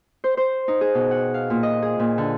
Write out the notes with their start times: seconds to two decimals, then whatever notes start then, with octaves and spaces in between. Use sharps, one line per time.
0.24 C5
0.37 C5
0.68 D#4
0.81 G#4
0.95 B2
1.11 F#5
1.34 F5
1.50 A#2
1.63 D#5
1.82 G#4
1.99 A#2
2.18 D3